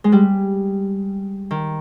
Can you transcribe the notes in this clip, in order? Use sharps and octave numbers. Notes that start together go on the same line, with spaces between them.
G#3
G3
D#3